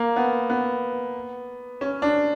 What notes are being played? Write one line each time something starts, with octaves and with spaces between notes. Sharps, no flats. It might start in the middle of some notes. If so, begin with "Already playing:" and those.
Already playing: A#3
B3
B3
C#4
D4